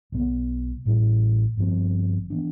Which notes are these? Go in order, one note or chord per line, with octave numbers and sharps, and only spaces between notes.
B1 B2 B3
A1 A2 G3
G1 G2 F3 C4
E3 B3 D4